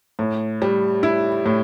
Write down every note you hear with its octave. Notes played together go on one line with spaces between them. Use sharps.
A2
G3
E4
A2